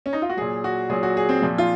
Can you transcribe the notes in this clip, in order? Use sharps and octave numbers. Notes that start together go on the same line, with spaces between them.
C#4
D#4
F4
F#4
A#2 F#3 G#4
F#4
A#2 F#3 G#4
F#4
G#4
C4
A#2 F3
F4